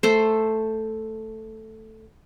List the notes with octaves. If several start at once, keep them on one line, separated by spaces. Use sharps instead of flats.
A3 A4 C5